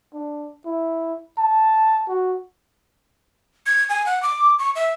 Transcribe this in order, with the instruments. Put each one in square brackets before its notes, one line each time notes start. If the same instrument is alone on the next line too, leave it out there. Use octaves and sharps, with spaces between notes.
[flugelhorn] D4
E4
A5
F#4
[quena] G#6
G#5
F#5
D6
C#6
E5